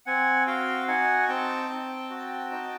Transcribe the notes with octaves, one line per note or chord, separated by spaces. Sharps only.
C4 F#5 G#5
F#4 F5 G5
D#4 F#5 G#5
C4 G5 A5
C4
F#4
D#4